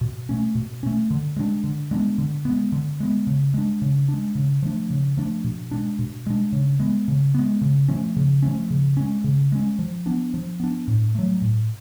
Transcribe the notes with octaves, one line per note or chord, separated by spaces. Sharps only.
B2
A3 C#4
B2
A3 C#4
D3
G#3 B3 D4
D3
G#3 B3 D4
D3
G#3 B3
D3
G#3 B3
C#3
G#3 D4
C#3
D4
G#3
C#3
F3 A3 D4
C#3
F3 A3 D4
B2
G#3 D4
B2
G#3 D4
C#3
G#3 B3
C#3
G#3 B3
C#3
F3 A3 C#4
C#3
F3 A3 C#4
C#3
G#3 C#4
C#3
G#3 C#4
F3
B3 D4
F3
B3 D4
A2
F#3 A3
A2